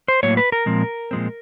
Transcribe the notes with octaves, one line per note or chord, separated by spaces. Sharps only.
C5
A2 F#3 A#3 C#5
B4
A#4
A#2 F3 G#3 C4
A#2 F3 G#3 C4